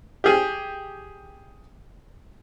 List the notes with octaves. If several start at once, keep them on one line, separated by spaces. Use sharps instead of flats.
G4 G#4